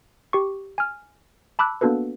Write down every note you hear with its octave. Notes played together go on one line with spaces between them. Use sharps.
G4 C#6
G#5 F6
A5 B5 D6 E6 F#6
A#3 B3 D4 F#4 A4 B4